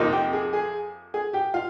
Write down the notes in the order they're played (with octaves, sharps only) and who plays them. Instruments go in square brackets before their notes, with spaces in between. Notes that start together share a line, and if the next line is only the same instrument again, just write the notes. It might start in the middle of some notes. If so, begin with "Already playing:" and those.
Already playing: [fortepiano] F2 C3 F3 A#3 D#4
[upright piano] G4 G5
G#4 G#5
G#4 G#5
G#4 G#5
G4 G5
F4 F5